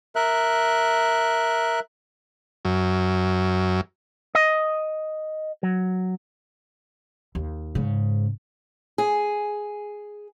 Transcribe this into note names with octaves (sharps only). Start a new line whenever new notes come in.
A#4 E5 F#6
F#2
D#5
F#3
D#2
G#2 C#3
G#4